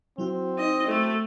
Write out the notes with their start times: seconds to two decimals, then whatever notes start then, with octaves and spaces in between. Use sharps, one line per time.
0.18 F#3 C4 E4 F#4
0.58 D#4 D#5
0.87 A3 A4